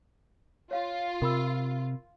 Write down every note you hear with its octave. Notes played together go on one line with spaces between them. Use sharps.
F4 C#5 F5
C3 A#4 B5 E6